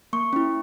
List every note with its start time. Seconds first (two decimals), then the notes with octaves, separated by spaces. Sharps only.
0.13 A#3 C#6
0.33 C#4 E4